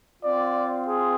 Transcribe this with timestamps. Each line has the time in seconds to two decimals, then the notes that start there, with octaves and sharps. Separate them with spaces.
0.23 C4 F4 D5
0.87 G#4